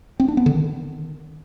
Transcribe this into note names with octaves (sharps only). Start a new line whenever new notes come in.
C4
D4
B3
D3
D#3